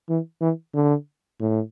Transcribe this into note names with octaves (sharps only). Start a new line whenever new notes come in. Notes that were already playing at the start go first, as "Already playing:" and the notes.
E3
E3
D3
A2